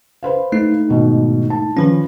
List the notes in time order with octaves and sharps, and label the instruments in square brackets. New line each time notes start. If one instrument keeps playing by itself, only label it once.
[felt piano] B4 C5 F5
[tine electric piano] A3 D#4
[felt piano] G#2 B2 D#3
A5
[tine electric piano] D#3 F3 C#4 [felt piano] F4 B4